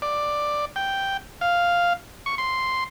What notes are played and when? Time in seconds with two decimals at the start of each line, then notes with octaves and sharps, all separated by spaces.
0.02 D5
0.76 G5
1.41 F5
2.26 C#6
2.38 C6